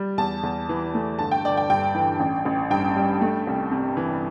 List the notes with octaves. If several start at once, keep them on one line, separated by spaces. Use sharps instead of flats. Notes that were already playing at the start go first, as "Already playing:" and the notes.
Already playing: G3
E2 A5
E2
E3
A3
G1 A5
G5
G1 D5
G5
G2 G5
E3
A1
A1
G2 G5
G3
A3
C2
C3
E3